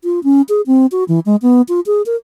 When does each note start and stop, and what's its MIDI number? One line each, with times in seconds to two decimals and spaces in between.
0.04 0.20 65
0.24 0.42 61
0.49 0.61 68
0.67 0.86 60
0.92 1.04 66
1.08 1.19 52
1.26 1.36 56
1.42 1.61 59
1.68 1.80 65
1.86 2.02 68
2.06 2.16 70